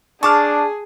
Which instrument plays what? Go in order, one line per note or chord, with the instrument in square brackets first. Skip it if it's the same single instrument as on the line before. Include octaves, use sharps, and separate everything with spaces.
[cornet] D4 [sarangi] G#4 [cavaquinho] A5 [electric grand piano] C#6 D6 F6